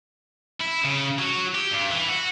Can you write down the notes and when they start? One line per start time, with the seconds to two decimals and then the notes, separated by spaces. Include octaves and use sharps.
0.61 E4
0.85 C#3
1.19 F#3
1.55 G4
1.71 G2
1.91 E3
2.08 F#4